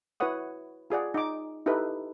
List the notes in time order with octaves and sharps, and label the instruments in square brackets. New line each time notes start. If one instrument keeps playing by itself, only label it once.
[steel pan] E4 F#4 B4 C#5 F#5 D#6
F4 G#4 D5 F#5
D#4 D6
D#4 E4 G4 A4 B4